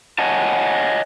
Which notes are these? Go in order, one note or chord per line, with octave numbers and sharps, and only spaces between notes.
C#5 D#5 F#5 G#5 A5